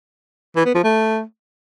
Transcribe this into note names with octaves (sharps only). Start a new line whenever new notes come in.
E3
B3
F3
A3